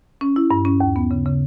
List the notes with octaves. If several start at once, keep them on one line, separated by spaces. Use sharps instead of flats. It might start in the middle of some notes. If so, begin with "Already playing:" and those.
C#4
E4
G2
C#4
D#2
B3
C#3
C#3